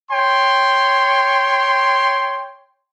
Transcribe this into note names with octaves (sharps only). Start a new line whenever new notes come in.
C#5 G5 C6